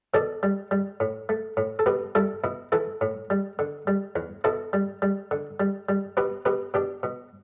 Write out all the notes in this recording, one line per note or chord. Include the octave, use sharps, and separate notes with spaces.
B2 A4 D5
G3
G3
A2
A3
A2
A4
B2 G4 B4
G3 E4 A4
B2 E4
E3 E4 A4
A2
G3
D3
G3
E2
B2 E4 A4
G3
G3
D3
G3
G3
B2 G4 B4
B2 G4 B4
B2 D4 G4
B2